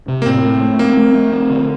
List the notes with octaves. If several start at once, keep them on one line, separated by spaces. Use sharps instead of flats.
C3
A#3
A2 C4
A3
A3
A#3 C4
A3
A3
C4
D3